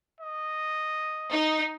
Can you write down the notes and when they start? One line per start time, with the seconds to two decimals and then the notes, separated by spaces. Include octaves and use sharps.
0.20 D#5
1.31 D#4